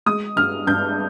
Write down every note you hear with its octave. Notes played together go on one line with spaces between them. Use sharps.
G#3 D#6
G2 F6
G2 G6